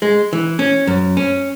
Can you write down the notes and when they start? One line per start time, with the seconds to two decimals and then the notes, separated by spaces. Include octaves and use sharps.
0.02 G#3
0.33 E3
0.59 C#4
0.87 F#2
1.17 C#4